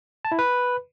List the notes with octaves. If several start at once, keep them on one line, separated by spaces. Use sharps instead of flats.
A5
E4
B4